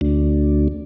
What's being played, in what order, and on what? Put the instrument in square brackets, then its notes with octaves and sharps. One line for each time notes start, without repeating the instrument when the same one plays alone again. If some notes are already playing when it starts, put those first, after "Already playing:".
[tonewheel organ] D2